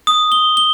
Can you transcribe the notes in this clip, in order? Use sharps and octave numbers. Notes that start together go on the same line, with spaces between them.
D#6
G7
G7